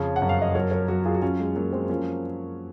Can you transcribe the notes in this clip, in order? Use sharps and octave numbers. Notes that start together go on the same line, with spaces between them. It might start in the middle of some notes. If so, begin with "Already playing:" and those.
Already playing: F2 C#3 C#5
F#5
F#2
F5
D#5
F#3 A#4 C#5
A#4 C#5
F#3 F#4 A#4
F4 G#4
F#4
F#3 C#4 F4
G#3
F#3 A#3
G#3 C4
F3 A#3 C#4